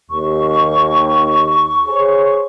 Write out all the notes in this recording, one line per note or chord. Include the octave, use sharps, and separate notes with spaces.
D#2 C#6
G#4 C5 C#5